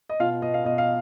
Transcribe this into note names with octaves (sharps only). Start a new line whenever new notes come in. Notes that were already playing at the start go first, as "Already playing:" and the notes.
D#5
B2 F4 F5
B2 D#5
F5
B2 D#5
F5